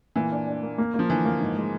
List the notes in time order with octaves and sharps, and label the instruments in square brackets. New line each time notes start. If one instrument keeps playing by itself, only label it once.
[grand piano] A#2 [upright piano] E3
[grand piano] D4
D4
A#3
A#3
[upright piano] F3 [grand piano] A#3
[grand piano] D3 [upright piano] E3
[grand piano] A#3
G#2
G#3